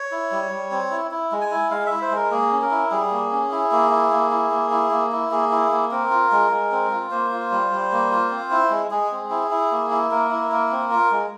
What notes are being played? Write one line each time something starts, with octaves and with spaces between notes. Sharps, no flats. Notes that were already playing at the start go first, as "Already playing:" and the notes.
Already playing: C#5
E4
G3
G3
C4
E4
E4
G#3
G#5
E4
G#3 F5
E4 E5
C5
G#3 A#4
A#3 G#4
C#4
A#4
E4
G3 G#4
A#3
C#4
E4
A#3
E4
A#3
E4
A#3
E4
A#3
E4
A#3 G#4
E4
A#3
C4 A#4
F4
G#3
G#3
C4
F4
A#3 C5
F4
G3
G3
A#3
F4
C4
E4
G#3
G#3 G#4
C4
E4
E4
A#3
E4
A#3 A#4
E4
A#3
C4
F4
G#3